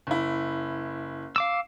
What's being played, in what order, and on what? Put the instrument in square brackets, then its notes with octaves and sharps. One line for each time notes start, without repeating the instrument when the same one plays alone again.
[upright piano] F#1 E4
[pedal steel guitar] F5 D6 E6